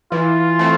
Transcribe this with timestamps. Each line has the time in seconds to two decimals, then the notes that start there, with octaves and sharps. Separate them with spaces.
0.12 E3 F4
0.59 A3 C4